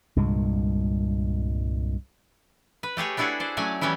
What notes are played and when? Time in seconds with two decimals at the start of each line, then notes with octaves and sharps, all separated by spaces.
0.16 C2 G2 A#2 G#3
2.83 B4
2.97 A3 G4 G#4 C#5
3.17 B3 D4 E4 F#4 G#4 A4
3.40 C5 D5
3.57 F#3 A3 C#4 D5 G#5
3.81 E3 G3 B3 C#4 E4